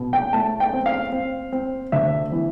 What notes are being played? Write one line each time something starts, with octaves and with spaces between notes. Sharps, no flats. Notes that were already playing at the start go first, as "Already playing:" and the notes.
Already playing: B2
G5
A3 A5
G5
C4
F5
C4
C4
D2 E5
E3